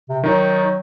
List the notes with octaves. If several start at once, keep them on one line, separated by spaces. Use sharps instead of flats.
C3
D#3 F#3 D#4